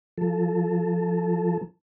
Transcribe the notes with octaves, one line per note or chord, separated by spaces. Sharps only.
F3 A4